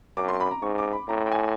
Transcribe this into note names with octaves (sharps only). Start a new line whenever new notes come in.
F#2 D6
C6
B5
A#5
G#2 C#6
D6
B5
A2 A#5
G5
G#5